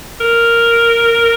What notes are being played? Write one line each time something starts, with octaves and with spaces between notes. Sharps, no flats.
A#4